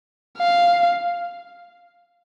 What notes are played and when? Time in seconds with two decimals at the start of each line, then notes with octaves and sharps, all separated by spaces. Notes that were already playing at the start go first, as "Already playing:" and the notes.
0.38 F5